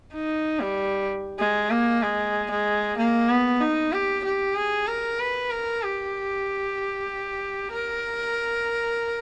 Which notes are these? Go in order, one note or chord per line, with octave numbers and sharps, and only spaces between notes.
D#4
G3
G#3
A#3
G#3
G#3
A#3
B3
D#4
G4
G4
G#4
A#4
B4
A#4
G4
A#4